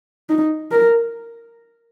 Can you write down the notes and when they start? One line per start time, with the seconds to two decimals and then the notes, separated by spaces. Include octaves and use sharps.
0.29 D#4
0.71 A#4